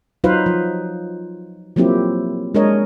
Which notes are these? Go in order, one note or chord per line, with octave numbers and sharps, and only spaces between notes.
F#3 D#4 F4 B4 C5 F5
F3
F3 F#3 A#3 C4 E4 G4
G#3 D4 A#4 C#5 D#5